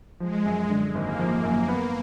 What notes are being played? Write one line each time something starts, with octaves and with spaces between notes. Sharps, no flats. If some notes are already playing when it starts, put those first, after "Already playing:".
F3 G#3
F#2
D3
G#1 A#3
F3
F#2
B3